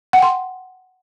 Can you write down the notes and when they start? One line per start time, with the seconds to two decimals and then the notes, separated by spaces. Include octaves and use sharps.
0.13 F#5
0.18 G5
0.22 C6